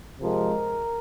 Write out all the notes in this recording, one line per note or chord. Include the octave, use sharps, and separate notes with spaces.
C3 F3 G#3 C4 A#4